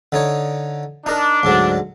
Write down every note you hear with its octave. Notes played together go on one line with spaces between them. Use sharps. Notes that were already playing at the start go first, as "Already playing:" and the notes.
D3 D#4 C#5
D4 D#4 A#4
D2 G#2 F#3